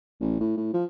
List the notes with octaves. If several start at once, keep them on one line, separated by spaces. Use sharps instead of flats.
A1
A2
A2
F3